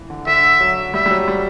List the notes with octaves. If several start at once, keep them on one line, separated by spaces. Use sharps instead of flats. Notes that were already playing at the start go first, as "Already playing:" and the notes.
Already playing: E3
D3
D3 E5
F#3
G3 E5
G3
F#3
G3